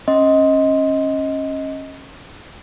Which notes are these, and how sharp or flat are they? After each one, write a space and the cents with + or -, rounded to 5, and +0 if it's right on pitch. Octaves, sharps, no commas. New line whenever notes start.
C#4 -25 D#5 +15 C6 +0